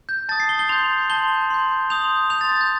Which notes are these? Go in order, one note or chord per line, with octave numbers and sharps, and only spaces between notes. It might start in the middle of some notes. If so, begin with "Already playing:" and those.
G6
A5 D#6 G6 A6
C7
G7
G7
C6 G6 F7
A5 C6 G6 G7
C6 G6
C6 D#6 G6 F7
C6 D#6 G6 F7
A6
A6
G6